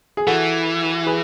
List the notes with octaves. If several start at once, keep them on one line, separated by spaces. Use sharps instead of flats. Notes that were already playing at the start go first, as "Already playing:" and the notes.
G#4
E3 F#4 A4
G#4 B4